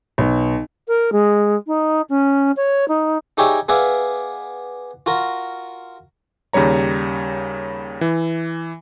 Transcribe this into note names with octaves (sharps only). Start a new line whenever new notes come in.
B1
A#4
G#3
D#4
C#4
C#5
D#4
D#4 G4 G#4 C#5 D5 E5
B3 G#4 B4 D5 E5 F5
F4 F#4 A#4
D#2 C#3 G3 C#5 A#5
E3